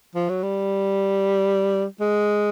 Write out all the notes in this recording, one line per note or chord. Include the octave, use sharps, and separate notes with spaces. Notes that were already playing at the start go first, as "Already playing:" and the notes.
F3
F#3
G3
G#3